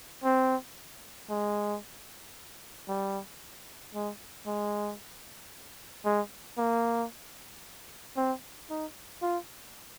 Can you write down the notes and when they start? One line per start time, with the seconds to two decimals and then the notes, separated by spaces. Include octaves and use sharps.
0.24 C4
1.30 G#3
2.88 G3
3.94 G#3
4.47 G#3
6.05 G#3
6.58 A#3
8.17 C4
8.70 D#4
9.22 F4